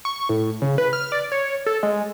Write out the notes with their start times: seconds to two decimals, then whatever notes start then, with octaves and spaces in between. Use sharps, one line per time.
0.05 C#6
0.29 A2
0.62 C#3
0.78 B4
0.93 F6
1.12 D5
1.32 C#5
1.66 A4
1.83 G#3